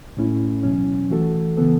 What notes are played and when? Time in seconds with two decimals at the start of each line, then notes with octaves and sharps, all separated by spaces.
0.17 A2 A3 C#4 E4
0.63 E2 B2 F#3 C#4
1.10 E3 A3 F#4 A4
1.57 C#3 E3 B3 A4